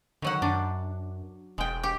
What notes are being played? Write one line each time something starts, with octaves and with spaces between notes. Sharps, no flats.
D3 D#3 F#3 F#5
F#2 D4
E1 G#3 G5
G4